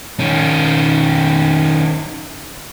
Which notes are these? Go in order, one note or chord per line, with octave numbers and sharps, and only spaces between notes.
D#3 C#4